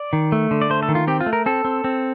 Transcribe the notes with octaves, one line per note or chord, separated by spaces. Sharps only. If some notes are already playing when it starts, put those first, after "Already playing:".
Already playing: D5
D#3
A3
D3
D5
A3 C5
A4
D#3
F4
C4 G4
F4
A3
A#4
C4 A4
C4
C4